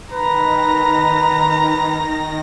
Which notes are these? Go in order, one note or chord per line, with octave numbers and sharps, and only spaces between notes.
D#3 B4 A#5 A#6